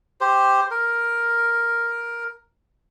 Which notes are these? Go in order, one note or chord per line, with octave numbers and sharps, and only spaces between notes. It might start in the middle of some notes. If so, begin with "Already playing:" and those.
G4 C5
A#4